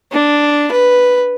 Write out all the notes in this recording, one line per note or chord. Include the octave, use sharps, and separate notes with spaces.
D4
B4